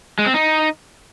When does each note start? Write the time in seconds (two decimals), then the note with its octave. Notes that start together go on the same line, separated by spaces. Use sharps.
0.19 G#3
0.26 C4
0.34 D#4